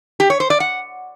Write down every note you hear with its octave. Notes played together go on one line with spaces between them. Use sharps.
G4
C#5
C5
D5
F#5